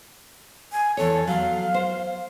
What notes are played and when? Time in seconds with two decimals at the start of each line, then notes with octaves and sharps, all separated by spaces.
0.72 G#5
0.97 E2 A4 C#5
1.27 F#3 F5
1.74 C5